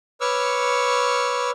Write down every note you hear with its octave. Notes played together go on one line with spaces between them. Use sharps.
B4 C#5 C#6 D6 E6 F6